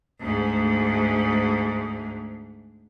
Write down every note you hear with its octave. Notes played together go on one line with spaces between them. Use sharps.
D2 G#2